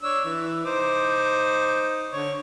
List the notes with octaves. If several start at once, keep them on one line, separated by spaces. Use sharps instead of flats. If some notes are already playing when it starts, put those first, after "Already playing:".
D4 C#5 E6
E3
D#4 C5 D6
D3 C#5